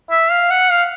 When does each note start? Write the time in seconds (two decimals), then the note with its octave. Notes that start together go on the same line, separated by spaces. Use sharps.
0.10 E5
0.31 F5
0.50 F#5
0.71 F5